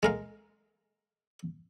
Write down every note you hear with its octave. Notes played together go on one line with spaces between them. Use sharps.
G#3 A#4 F5